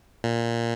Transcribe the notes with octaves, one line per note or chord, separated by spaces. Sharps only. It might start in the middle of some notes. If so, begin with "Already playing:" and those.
A#2